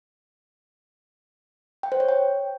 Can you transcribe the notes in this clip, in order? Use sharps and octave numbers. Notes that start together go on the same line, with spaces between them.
G5
C5
C#5
G5